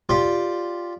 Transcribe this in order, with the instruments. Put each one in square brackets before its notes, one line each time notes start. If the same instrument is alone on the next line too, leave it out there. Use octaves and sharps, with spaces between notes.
[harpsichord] F4 G4 D5